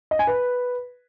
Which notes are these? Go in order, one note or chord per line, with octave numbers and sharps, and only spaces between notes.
D#5
G#5
B4